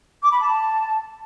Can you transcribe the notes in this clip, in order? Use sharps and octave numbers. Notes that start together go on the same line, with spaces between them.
D6
B5
A5